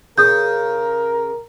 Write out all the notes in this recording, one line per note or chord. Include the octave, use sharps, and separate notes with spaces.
C#3 A#4 D#6 G6